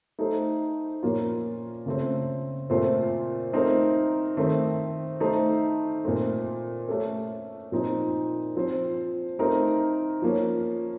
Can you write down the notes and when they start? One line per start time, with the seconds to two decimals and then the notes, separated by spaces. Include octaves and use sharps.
0.19 A3 D#4 A4 C5
1.03 A#2 F3 A#3 C#4 F4
1.86 C#3 A3 C4
2.70 A#2 A3 C4 F4 C5
3.53 A3 C4 D#4 A#4
4.37 D#3 A3 C4
5.20 A3 D#4 A4 C5
6.05 A#2 A3 C4
6.89 A3 C#4 A4
7.72 A#2 F3 C4 D#4
8.56 F3 C4 F4 C5
9.39 A3 C4 D#4 A#4
10.22 F3 A#3 C#4